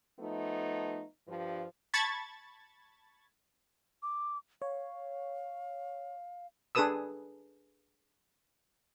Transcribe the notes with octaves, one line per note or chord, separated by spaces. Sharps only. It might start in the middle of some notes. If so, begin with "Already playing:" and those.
F3 A3 B3 D#4
G2 F3
A5 B5 C#6 G#6 A6
D6
C#5 F5
D4 G#4 A4 B4 D#6 E6